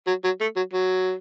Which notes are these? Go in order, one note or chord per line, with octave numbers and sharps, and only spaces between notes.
F#3
F#3
A3
F#3
F#3